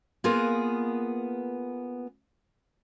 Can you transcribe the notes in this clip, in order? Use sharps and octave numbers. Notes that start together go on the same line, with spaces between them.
A#3 B3 F4 G#4 A#4 B4